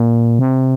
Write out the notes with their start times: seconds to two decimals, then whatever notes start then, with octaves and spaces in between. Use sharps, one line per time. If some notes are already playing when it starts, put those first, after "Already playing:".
Already playing: A#2
0.39 C3